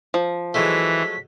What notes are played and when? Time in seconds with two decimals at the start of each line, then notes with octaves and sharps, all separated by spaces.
0.14 F3
0.54 E3 F#3 G#3 A3 B6